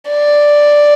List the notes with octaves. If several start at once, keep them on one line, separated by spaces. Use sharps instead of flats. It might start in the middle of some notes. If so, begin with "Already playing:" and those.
D5